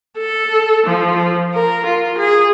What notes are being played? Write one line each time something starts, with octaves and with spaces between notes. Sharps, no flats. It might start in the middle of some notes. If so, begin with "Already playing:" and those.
A4
F3
A#4
F4
G#4